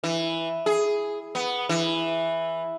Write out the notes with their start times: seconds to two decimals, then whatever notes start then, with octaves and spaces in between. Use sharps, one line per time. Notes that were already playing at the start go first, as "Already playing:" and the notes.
0.04 E3
0.66 G#4
1.35 B3
1.69 E3